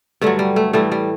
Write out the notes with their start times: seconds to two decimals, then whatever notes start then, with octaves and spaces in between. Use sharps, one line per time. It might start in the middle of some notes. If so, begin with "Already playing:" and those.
0.21 G2 D3 F#3 A3
0.39 G3
0.56 A3
0.73 A2 E3 G3 A3
0.92 G3